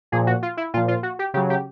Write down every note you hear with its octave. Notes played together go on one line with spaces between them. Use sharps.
A#2 F3 G#4
F#4
F4
E4
A#2 F3 F4
F4
F#4
G4
C#3 F#3 G4
G4